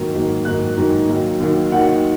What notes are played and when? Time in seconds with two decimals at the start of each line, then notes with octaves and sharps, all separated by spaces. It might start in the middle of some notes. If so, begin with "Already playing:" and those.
Already playing: G#2 D#3 F#3 A#3
0.14 G#2 D#3 F#3 A#3
0.45 G#2 D#3 F#3 A#3 F#6
0.77 G#2 D#3 F#3 A#3
1.09 D#2 D#3 F#3
1.40 D#2 D#3 F#3
1.72 D#2 D#3 F#3 F#5